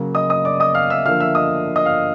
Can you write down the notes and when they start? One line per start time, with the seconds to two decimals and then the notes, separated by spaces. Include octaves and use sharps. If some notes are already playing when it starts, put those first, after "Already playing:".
Already playing: C#3 F#3 A#3
0.15 D#5 D#6
0.30 D#5 D#6
0.45 D5 D6
0.60 D#5 D#6
0.74 F5 F6
0.90 E5 E6
1.05 D3 F3 A#3 F5 F6
1.20 E5 E6
1.35 D#5 D#6
1.76 D#5 D#6
1.85 F5 F6